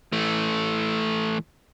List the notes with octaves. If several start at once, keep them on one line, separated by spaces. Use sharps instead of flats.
E3 A3